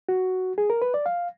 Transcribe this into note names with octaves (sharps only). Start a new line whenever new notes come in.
F#4
G#4
A#4
B4
D5
F5